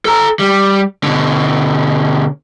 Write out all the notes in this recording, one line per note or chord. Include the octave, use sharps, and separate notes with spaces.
A4 A#5
G3
B2 D3